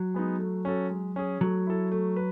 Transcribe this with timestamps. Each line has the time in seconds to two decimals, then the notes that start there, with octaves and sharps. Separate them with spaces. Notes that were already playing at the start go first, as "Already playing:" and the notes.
Already playing: F#3
0.14 G#3 B3 D#4
0.39 A3
0.65 C#4 F#4 A4
0.90 G#3
1.16 C#4 G#4
1.41 F#3 A3
1.67 E4 A4
1.92 A3
2.16 B4